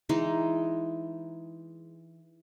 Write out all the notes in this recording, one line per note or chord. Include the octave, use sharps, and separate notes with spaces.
E3 G#3 D#4